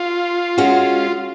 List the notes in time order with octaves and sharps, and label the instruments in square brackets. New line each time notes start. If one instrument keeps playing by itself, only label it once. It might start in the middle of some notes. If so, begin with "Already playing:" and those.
Already playing: [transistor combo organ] F4
[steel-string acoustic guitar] G#3 C#4 F#4